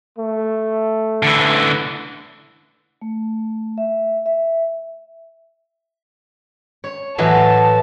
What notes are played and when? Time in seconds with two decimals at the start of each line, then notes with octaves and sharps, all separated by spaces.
0.18 A3
1.23 D3 E3
3.02 A3
3.78 E5
4.26 E5
6.84 C#5
7.18 A2 E3 F#3 A5